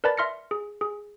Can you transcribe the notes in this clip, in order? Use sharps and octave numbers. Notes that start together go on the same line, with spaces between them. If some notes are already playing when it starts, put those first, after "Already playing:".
A#4 B4 D5 A5 B5 A6
E5 C6 F6 A#6 C#7
G#4
G#4